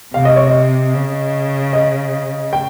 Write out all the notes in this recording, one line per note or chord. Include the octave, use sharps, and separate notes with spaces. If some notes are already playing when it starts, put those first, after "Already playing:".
C3 F5
D#5
C#5
D#5
C#3
D#5
G5